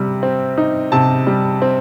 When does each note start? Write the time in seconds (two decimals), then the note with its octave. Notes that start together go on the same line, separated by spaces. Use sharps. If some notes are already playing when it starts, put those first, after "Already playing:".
Already playing: C3 G3
0.23 C4
0.58 D#4
0.92 C3 A5
1.27 G3
1.62 C4